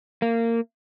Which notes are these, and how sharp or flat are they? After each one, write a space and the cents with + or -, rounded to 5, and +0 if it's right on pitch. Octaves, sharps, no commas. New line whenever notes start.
A#3 -20